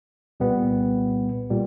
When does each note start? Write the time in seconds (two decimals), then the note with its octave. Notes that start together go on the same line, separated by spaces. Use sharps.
0.40 C2 A#2 G3 B3
1.50 A#2 G3